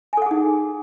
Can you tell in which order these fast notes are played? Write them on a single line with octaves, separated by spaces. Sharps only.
G#5 A4 F#5 G#4 D#4